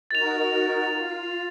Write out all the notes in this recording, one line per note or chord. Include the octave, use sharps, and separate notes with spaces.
D#4 F#4 A#4 A6 F7
F4